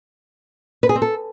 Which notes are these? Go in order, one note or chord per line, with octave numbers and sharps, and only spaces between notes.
B4
G#4
C4
A4